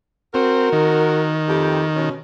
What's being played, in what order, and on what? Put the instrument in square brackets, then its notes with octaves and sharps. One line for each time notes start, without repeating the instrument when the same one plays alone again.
[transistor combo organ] C4 [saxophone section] F#4 A#4
[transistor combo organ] D#3
[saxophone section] F2 A3 G4
B2 C#4